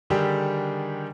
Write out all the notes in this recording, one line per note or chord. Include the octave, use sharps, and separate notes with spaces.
D3 D#3 G3 D4 G4 G#4